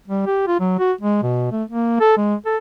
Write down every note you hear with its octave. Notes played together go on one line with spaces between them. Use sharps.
G3
G4
F4
F#3
F#4
G#3
B2
A3
A#3
A4
G#3
A4